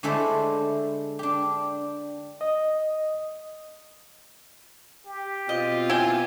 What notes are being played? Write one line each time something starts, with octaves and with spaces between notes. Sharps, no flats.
D3 G#3 A3 E4 A4 C5
D4 G4
D#5
G4
B2 C4 F4 D#5
E4 G5 G#5